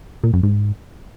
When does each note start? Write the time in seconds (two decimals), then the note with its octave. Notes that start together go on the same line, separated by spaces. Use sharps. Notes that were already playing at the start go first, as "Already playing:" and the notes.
0.24 A#2
0.33 F#2
0.43 G#2